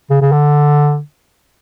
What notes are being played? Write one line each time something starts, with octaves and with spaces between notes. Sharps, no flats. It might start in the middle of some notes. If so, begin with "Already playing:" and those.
C#3
C#3
D3